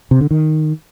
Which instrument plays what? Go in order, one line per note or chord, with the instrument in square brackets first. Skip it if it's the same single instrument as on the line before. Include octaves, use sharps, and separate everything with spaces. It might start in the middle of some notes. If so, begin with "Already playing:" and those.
[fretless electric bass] C3
D3
D#3